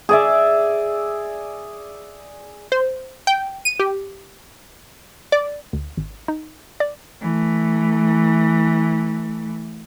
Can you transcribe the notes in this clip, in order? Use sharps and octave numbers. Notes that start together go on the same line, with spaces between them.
G#4 D5 E5
C5
G5
D#7
G4
D5
D2
G#1
D#4
D5
E3 A3